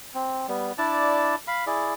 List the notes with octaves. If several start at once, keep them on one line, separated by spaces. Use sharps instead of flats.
C4
G3 B3
D4 E4 D5 A5
F5 B5
E4 G#4 D5